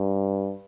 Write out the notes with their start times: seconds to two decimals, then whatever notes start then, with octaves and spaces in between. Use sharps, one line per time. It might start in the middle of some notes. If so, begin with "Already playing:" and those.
Already playing: G2